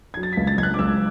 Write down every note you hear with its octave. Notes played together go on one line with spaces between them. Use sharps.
F#3 G#6
A6
B6
C#2
A6
C#2 G#6
F#6
D6
C#2 E6